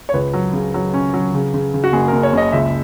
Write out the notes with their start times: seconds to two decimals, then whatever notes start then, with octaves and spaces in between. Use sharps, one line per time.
0.09 C#5
0.13 C#2 B4
0.33 F#3
0.53 C#3
0.74 F#3
0.94 C#4
1.14 F#3
1.34 C#3
1.54 C#3
1.74 C#3
1.84 F#4
1.93 F#1 G#4
2.08 F#1 A#4
2.23 C#5
2.33 F#1 D#5
2.52 C#2 E5